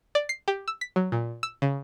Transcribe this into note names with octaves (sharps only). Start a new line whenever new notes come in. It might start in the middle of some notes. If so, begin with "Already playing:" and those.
D5
C7
G4
E6
B6
F#3
A#2
E6
C#3